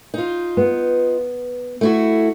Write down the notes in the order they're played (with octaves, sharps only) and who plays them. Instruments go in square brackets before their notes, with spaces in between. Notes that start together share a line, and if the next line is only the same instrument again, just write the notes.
[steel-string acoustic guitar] D#4 F4
[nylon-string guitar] B3
[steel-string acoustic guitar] A3 E4 F#4